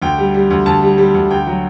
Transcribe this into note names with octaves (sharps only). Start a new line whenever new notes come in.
D2 G5
G3
G3
D2
D2 A5
G3
G3
D2
D2 G5
F#3